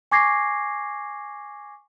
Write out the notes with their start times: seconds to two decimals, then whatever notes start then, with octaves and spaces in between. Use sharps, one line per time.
0.12 G#5 C#6 D6 G#6 A#6 C7